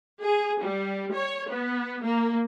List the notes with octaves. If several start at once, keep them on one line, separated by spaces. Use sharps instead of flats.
G#4
G3
C#5
B3
A#3